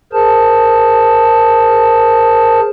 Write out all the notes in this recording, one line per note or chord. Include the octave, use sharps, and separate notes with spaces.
G#4 A#4 C5 A5